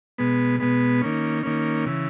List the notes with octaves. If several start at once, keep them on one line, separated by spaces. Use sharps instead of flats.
B2 G#3 B3
B2 G#3 B3
D#3 A#3 C#4
D#3 A#3 C#4
C#3 E3